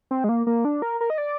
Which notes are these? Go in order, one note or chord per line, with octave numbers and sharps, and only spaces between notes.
C4
G#3
A#3
A#3
D4
A#4
A#4
D#5
D5